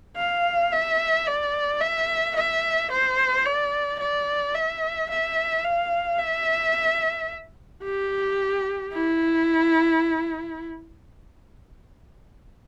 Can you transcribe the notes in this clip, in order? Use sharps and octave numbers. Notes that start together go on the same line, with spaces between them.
F5
E5
D5
E5
E5
C5
D5
D5
E5
E5
F5
E5
G4
E4